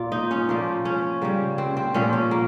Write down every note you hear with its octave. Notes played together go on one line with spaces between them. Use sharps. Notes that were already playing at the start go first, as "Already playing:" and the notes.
Already playing: A#2 A#3 F4
D#4
C#4
A#2 F3 A#3
C#4
C#3 G3 A#3
C4
C4
A#2 F3 A#3 C#4
C#4
A#3